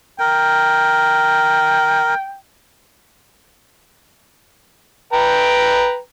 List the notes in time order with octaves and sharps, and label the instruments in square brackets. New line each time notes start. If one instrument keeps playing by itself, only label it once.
[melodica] A#4 [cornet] G5
[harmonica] B4 G5 A#5